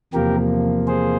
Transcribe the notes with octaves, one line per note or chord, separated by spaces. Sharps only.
E2 C3 F3 A#3 G4 A#4
G#4 C5